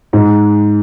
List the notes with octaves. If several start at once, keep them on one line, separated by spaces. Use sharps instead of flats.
G#2